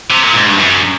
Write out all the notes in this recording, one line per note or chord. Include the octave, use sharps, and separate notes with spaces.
C3
A#2
G#2
G2
F#2